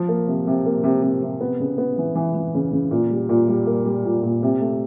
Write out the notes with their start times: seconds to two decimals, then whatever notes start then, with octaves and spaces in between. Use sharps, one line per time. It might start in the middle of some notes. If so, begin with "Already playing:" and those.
Already playing: F3
0.09 A#3
0.28 C3
0.47 C3
0.66 A#3
0.84 C3
1.02 C3
1.22 C3
1.41 B3
1.60 C#3
1.78 B3
1.98 E3
2.15 E3
2.35 E3
2.54 C#3
2.73 C#3
2.91 A#2
3.11 G3
3.29 A#2
3.48 G3
3.67 A#3
3.86 G3
4.05 A#2
4.23 A#2
4.43 C3
4.61 A3